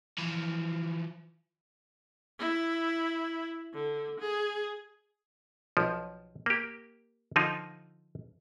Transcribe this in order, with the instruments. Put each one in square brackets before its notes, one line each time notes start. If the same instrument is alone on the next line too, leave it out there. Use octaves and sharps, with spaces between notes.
[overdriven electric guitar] E3 F3
[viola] E4
D3
G#4
[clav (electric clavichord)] B1 F3
A#3 G4
D3 F3 D#4 F4